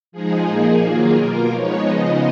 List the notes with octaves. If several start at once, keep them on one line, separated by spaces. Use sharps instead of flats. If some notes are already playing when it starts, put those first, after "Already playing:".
F3 G#3 D#4 G#4
A#2 F3 A#3 D#4 G#4
D#3 F#3 A#3 F4 G#4
B2 A#3 F4 A#4
F3 G#3 B3 D#4 C#5
C#3 F3 G#3 B3 D#4 D#5